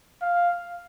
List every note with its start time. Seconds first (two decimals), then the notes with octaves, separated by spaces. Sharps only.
0.22 F5